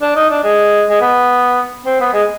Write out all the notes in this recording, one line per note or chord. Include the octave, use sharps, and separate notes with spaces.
D4
D#4
D4
G#3
G#3
B3
C4
B3
G#3